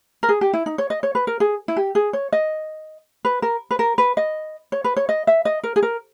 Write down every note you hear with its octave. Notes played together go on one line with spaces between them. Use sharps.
A#4
G#4
G4
E4
D#4
C#5
D#5
C#5
B4
A#4
G#4
E4
G4
G#4
C#5
D#5
B4
A#4
B4
A#4
B4
D#5
C#5
B4
C#5
D#5
E5
D#5
A#4
G#4
A#4